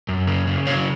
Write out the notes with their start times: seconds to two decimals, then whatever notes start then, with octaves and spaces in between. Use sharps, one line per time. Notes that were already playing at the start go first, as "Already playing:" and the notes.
0.09 F#2
0.27 C#3
0.47 C#3
0.67 F#3 C#5 F5